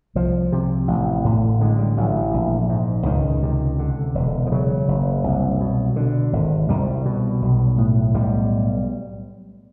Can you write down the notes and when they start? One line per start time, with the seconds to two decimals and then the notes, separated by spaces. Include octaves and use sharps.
0.15 C2 F3
0.52 C3
0.88 A1
1.24 A2
1.61 D3 G#3
1.79 G3
1.97 A1 F#3
2.34 A#1
2.69 G#2
3.06 C#2 D#3
3.43 C3
3.79 D3
4.15 E1
4.47 F3
4.52 C#3 F#3
4.88 F#1
5.24 C2
5.61 B2
5.96 D3
6.33 G#1
6.69 C2 G3
7.05 B2
7.42 B1
7.78 A2
8.14 B1 G3